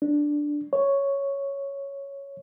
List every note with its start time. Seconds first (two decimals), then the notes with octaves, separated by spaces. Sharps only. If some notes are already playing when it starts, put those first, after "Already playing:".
0.02 D4
0.73 C#5